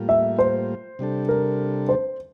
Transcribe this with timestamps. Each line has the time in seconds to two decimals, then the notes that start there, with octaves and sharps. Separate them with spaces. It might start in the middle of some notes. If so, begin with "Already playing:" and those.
Already playing: A2 G3 A#3 F4
0.09 E5
0.39 C5
0.99 C3 G3 D4 A4
1.29 A#4
1.89 C5